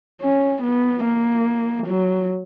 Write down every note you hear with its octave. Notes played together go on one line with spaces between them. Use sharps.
C#4
B3
A#3
F#3